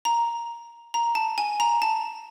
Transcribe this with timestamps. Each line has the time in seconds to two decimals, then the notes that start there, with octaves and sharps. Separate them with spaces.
0.05 A#5
0.94 A#5
1.15 A5
1.38 G#5
1.60 A#5
1.82 A5